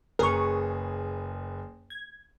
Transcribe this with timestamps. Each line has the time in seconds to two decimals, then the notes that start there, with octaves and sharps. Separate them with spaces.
0.19 F#1 G#4 A#4 B4 C#6
1.90 G#6